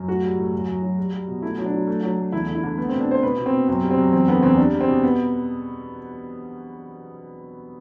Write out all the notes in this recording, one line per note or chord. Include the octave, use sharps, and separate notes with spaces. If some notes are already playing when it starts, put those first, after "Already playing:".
Already playing: F#2
A2 F#4
G3
A2
F#2
F#2
F#3
G3
G3
B2
A3 E4
F#3
D4
F#3
A3
F#3
A3
E2 E4
D3
E4
D3
A3 B3
B2 C4
D4
B2 C5
B2 B4
B2
C4
B2
F#2 C4
G3
C4
F#2
E2 C4
D3 B3
E2 C4
G3 D4
G3
C4
B2
B3